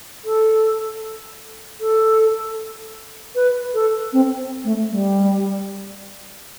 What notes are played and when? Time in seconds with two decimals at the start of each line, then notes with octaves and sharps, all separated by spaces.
0.25 A4
1.80 A4
3.35 B4
3.74 A4
4.13 C4
4.64 A3
4.90 G3